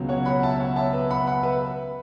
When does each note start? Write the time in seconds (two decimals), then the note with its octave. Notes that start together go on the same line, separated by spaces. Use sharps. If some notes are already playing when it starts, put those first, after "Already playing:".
Already playing: C#2 B2 F#3
0.09 C#5 F#5
0.25 F#5 B5
0.43 E5 A5
0.60 C#5 F#5
0.76 E5 A5
0.93 B4 E5
1.10 F#5 B5
1.27 F#5 B5
1.43 B4 E5